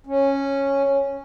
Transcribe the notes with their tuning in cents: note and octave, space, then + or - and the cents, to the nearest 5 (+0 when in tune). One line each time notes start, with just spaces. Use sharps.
C#4 -5